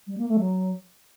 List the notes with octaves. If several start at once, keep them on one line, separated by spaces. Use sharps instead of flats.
G3
A#3
A3
F#3